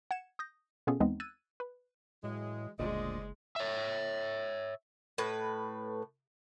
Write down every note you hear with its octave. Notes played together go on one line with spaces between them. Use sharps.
F#5 G#6 C#7 E7
D#6 G6 A#6
B2 B3 C#4 F4 G#4 A4
D#2 E3 G#3 B3 C4 D#4
E6 F#6 G#6 A6 D#7
B4
A2 E3 F#3 G#3
F#1 D2 A#2 G#3 C5 D5 D#5
C#5 E5
A2 B4